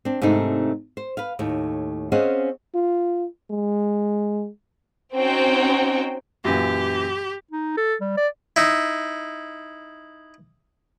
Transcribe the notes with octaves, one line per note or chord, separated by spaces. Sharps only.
C4 D4
G#2 C3 A3 C4 D4 D#4
C5
B4 F5
D#2 A2
C4 C#4 G#4 D#5 F5 F#5
F4
G#3
C4 C#4 D#4 F#4 G5
F#2 A#2 E3 G4
D#4
A4
G3
D5
D#4 E4